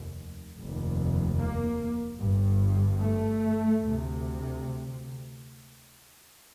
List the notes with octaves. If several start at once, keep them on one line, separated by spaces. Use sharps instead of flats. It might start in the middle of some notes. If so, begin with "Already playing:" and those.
Already playing: F1 D#2
F1 D#2
A#3
G1 G2
A3
D2 C3